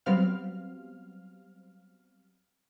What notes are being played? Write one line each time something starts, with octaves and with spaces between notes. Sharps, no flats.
F#3 G3 B3 C4 F5 F6